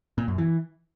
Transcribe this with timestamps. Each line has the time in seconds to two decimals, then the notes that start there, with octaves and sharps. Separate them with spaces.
0.18 A#2
0.28 F#2
0.38 E3